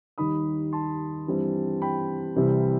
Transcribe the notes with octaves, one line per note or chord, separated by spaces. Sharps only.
D#2 D#3 G3 D#4 B5 D#6
A5 C6
G2 E3 G3 C4
G5 B5
C2 C3 E3 G3 C4